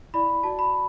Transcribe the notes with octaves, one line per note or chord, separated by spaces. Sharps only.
E4 D5 B5
F#4 D5 A5
B5